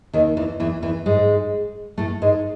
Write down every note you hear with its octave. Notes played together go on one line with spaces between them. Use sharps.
D#2 D#3
E2 E3
E2 E3
E2 E3
G#2 G#3
A2 A3
G#2 G#3